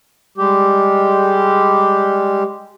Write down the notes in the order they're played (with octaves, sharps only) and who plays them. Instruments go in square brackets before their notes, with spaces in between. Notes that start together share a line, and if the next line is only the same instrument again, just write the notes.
[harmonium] G3 G#3 G4